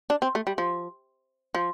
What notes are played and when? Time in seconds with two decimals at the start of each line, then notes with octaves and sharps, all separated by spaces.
0.10 D4
0.22 C4
0.35 A3
0.47 G3
0.58 F3
1.55 F3